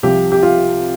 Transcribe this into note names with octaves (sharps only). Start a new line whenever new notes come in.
C2 C3 F3 G4
G4
F4